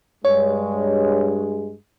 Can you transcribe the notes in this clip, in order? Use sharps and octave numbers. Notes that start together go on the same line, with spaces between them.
G2 G#3 C#5